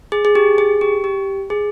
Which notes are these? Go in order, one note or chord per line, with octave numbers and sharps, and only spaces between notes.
G#4
G#4
G4
G#4
G4
G4
G#4